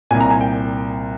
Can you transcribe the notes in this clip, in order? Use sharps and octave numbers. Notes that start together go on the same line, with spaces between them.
C2 A#2 G#5
A#5
G#5
G5